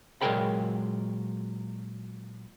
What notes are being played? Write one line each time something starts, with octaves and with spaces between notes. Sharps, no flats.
A#2 F#3 G#3 A#4 G5 B5